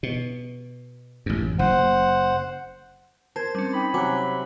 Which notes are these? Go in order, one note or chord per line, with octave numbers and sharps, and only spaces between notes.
B2
A1 F#2
F#1 C5 F#5
A#4 C5 A5 G#6
G3 C4 C#4
D#4 G5 B5 D6
C3 F#3 G#5 D6 F#6